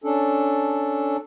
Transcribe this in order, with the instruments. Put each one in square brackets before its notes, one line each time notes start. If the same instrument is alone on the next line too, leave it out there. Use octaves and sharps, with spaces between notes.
[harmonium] C#4 D4 A4